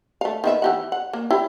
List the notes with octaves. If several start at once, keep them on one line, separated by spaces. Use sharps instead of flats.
A3 F5
D#3 B3 E5
E3 G4 F#5
F#5
A#3
E4 G4